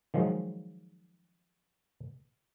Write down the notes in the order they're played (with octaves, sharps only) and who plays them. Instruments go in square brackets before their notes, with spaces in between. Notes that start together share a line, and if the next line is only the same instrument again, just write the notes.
[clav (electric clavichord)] D#3 F3 F#3 G#3